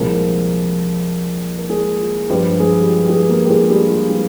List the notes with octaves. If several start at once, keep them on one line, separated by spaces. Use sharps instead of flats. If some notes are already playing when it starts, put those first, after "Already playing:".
Already playing: C2 A#2 F3 G#3 A#3 A#4
A#4
G#3 G#4
F4
G2 F3 G3 G#3 G4
G#3 G#4
G4
F4
G4
G#3 G#4
A#3 A#4
G4
G#3 G#4
F4
G3 G4
F4
G3 G4